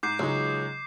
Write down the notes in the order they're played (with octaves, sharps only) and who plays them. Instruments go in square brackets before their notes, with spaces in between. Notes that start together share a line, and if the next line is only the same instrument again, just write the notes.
[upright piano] G#2 [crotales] D6 G6 C7
[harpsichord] C#2 [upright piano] F#3 G#3 D#4